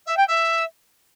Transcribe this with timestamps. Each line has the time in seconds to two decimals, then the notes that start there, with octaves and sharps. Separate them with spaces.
0.06 E5
0.16 G5
0.27 E5